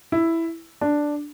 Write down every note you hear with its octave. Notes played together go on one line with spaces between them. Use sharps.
E4
D4